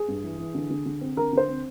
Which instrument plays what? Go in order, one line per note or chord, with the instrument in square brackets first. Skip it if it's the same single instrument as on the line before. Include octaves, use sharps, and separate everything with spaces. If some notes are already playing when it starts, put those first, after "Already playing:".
Already playing: [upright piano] G#4
G2
E3
E3
D3
D3
D3
C4
D3 A#4
D3 C5
C4